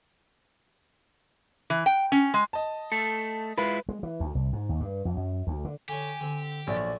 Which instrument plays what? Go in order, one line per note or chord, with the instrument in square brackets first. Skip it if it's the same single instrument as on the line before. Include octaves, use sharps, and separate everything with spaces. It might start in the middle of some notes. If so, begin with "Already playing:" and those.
[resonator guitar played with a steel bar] E3
G5
C#4
G#3
[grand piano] D#5 A5
[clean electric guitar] A3 A4
[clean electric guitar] G#3 E4 F4 [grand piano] B4
[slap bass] G#3
E3
D2
C2
G#2
D#2
G2
F2
F#2
D2
D3
[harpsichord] D3 C#5 [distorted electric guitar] G4 [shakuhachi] G#5
[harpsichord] D3 C4
[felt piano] A#1 [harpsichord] F#3 A3 [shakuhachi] D5